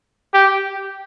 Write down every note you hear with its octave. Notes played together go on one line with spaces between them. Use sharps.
G4